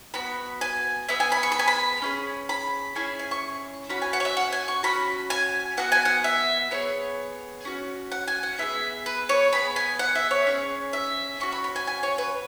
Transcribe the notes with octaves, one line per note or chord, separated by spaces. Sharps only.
B3 F#4 B5
G#5
B3 G#4 E5
G#5
B5
C#6
B5
G#5
B5
C#4 E4 G#4
B5
C#4 E4 G#4 G#5
G#5
C#6
C#4 F#4 B5
G#5
F#5
C#5
E5
F#5
G#5
C#6
C#4 F#4 B5
G#5
B3 F#4 F#5
G#5
F#5
E5
B3 G#4 C#5
C#4 F#4
F#5
G#5
F#5
B3 E4 G#4 E5
B4
C#5
B3 G#4 B5
G#5
F#5
E5
C#5
C#4 G#4
E5
C#4 F#4 C#6
B5
B5
G#5
G#5
C#5
B4